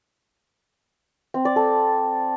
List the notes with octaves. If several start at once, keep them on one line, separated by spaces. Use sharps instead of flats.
C4
D5
A4